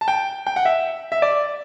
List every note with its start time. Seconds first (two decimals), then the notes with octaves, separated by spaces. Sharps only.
0.01 A5
0.08 G5
0.47 G5
0.56 F#5
0.65 E5
1.12 E5
1.22 D5